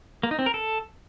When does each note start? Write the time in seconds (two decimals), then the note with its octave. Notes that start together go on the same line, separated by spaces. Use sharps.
0.23 A#3
0.31 D#4
0.39 C4
0.46 A#4
0.54 A4